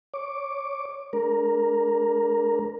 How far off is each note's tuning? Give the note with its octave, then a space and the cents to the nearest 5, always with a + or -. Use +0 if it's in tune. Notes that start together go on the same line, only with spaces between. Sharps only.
C#5 +0 D6 +0
G#3 +40 D4 -10 A#4 +5